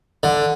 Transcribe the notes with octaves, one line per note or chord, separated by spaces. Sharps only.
D3